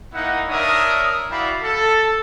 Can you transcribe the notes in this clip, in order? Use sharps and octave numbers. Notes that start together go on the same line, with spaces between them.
A#3 D#4 E4 F#5
D4 A#4 C#5 E5 D#6
E4 F#4 D5 F5 G5 B5
A4